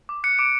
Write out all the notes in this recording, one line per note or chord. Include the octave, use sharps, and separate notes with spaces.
D6
F#6 C#7
D6 D7